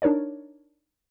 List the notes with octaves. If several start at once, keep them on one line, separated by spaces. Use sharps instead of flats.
D4 D#4 A#4 C#5 D5